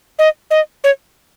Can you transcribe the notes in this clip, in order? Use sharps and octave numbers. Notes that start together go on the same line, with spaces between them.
D#5
D#5
C#5